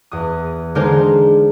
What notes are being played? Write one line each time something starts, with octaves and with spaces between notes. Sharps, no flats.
E2 D#6
D3 G#3 D#4 A#4 C5